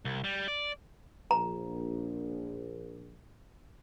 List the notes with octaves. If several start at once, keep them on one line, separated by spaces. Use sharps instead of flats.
C2
G3
D5
A#1 A#5